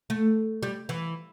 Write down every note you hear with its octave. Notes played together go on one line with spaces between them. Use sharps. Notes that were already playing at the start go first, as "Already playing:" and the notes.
A3
G3
E3